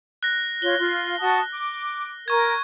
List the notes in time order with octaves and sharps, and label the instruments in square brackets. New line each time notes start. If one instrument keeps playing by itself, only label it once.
[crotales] F#6 A#6
[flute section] F4 C#5 [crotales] G7
[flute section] F4
F#4 A5 D#6
D6
[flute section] A#4 [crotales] C#6 G#6